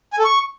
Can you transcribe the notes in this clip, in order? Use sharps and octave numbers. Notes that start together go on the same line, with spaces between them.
G#5
A4
C#6